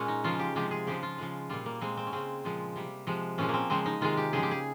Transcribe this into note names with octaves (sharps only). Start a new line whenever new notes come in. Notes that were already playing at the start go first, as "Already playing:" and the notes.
Already playing: A#2 G#3 C#4
D#4
C#3 F3 G#3 F4
G4
C3 F3 G#3 G4
G#4
C#3 F3 G#3 G4
F4
C#3 F3 G#3
A#2 G3 F4
A#3
A#2 G#3 C4
C4
C#4
C#3 G#3 C4
A#2 F3 G#3
C3 G3
C3 F3 G#3
A#2 F3 G#3 C#4
A#3
C4
C#3 F3 G#3 C4
D#4
C3 D#3 G#3 F4
G4
C#3 F3 G#3 G#4
G4
G#4